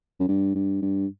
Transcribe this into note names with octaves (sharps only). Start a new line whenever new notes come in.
F#2
G2
G2
G2